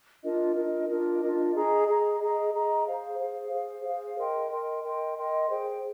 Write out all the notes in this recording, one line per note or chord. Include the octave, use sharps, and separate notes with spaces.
D4 F4 A#4 D#5
D4 F4 A#4 D#5
D4 F4 A#4 D#5
D4 F4 A#4 D#5
G#4 D#5 A#5
G#4 D#5 A#5
G#4 D#5 A#5
G#4 D#5 A#5
G#4 C5 F5
G#4 C5 F5
G#4 C5 F5
G#4 C5 F5
A#4 D#5 G5 C6
A#4 D#5 G5 C6
A#4 D#5 G5 C6
A#4 D#5 G5 C6
G#4 C5 G5